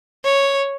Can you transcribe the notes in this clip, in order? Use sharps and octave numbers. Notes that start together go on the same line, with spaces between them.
C#5